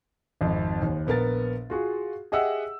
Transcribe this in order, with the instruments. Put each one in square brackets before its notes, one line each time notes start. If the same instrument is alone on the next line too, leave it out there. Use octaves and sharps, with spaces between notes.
[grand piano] G#1 F2
D#2
A#1 B3 A#4 A6
F4 F#4 G#4
G4 G#4 D#5 E5 F#5 E6